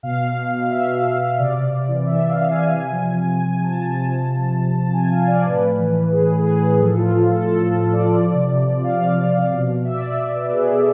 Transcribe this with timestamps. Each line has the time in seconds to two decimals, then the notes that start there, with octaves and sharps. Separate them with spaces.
0.03 B2 F5
0.20 B2
0.37 B2
0.54 B2
0.70 B2 E5
0.87 B2
1.04 B2
1.20 B2
1.39 C3 D5
1.55 C3
1.72 C3
1.88 E3
2.06 E3 E5
2.23 E3
2.29 F5
2.39 E3
2.51 G#5
2.56 C3
2.73 C3
2.91 F3
3.07 C3
3.24 C3
3.41 F3 G#5
3.58 F3
3.64 A5
3.75 C3
3.87 A5
3.92 F3
4.09 C3
4.26 F3
4.42 C3
4.59 C3
4.76 C3 A5
4.93 F3 G#5
5.10 C3 F5
5.27 F3 D5
5.45 A2 B4
5.62 A2
5.78 E3
5.95 E3
6.12 A2 G#4
6.30 A2
6.46 A2 G#4
6.63 A2
6.80 F3 A4
6.97 F3 F4
7.15 A2
7.31 F3 A4
7.48 A2 A4
7.65 F3
7.82 F3
7.93 D5
7.99 F3
8.16 F3
8.33 C3
8.50 F3
8.67 F3
8.83 F3 F5
9.00 F3
9.18 F3
9.35 C3
9.51 B2
9.68 B2
9.84 B2 E5
9.93 D5
10.01 B2 E5
10.20 B2
10.35 B2 B4
10.53 B2 G#4
10.69 B2 A4